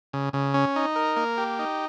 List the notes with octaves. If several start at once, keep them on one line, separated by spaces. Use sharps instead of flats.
C#3
C#3
C#4
D#4
A#4
A#3
G4
D#4